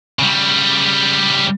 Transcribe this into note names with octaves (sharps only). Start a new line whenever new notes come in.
C#3 G3